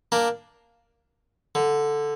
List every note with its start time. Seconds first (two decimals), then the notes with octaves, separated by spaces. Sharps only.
0.12 A#3 D4
1.55 D3